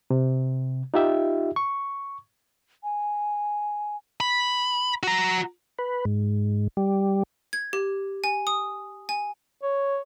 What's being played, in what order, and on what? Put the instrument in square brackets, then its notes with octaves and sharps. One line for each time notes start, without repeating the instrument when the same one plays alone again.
[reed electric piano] C3
D#4 F4 G4 E5
C#6
[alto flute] G#5
[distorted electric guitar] B5
F#4 A#5
[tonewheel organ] B4
G#2
G3
[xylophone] G#6
G4
G#5
D#6
G#5
[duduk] C#5